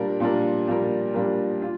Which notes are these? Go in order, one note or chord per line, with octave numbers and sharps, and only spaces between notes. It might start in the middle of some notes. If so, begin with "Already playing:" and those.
Already playing: A#2 G3 D4 A#4
A#2 G3 D4 A#4
A#2 G3 D4 A#4
A#2 G3 D4 A#4
F4